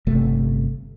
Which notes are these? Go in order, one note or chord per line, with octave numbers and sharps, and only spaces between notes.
G1 C3 A3